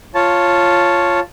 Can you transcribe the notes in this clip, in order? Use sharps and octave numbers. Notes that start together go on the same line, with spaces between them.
F4 C#5 A5